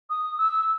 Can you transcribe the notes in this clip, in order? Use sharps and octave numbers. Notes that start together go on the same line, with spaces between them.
D#6
E6